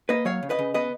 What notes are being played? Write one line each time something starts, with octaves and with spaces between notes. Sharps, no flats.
A#3 B4 D#5
F#3 C#5 F5
C#3
B4 D#5
C#3
B3 B4 D#5